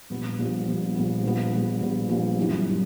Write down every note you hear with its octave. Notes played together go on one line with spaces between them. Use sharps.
A#1 A#2 G3 B3
A#1 A#2 G3 B3
A#1 A#2 G3 B3
A#1 A#2 G3 B3
A#1 A#2 G3 B3
A#1 A#2 G3 B3
A#1 A#2 G3 B3
A#1 A#2 G3 B3
G1 F#2 E3 G3
E3 G3